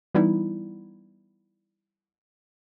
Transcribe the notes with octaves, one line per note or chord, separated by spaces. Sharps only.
E3 G3 B3 D#4 E4